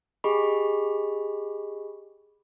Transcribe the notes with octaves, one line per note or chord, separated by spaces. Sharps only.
G4 G#4 D#5 B5 C#6